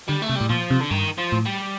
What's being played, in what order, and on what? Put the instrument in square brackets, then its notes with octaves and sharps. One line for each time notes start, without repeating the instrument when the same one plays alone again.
[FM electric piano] D3 [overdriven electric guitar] G3
[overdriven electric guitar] A3
[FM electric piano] C3
[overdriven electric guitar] G3
[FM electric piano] A2
[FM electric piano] A#2 [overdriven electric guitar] F3
[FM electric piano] C3
[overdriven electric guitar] D3
[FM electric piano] G2 [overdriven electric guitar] D#3
[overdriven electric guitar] F3
[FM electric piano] A2
[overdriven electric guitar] G3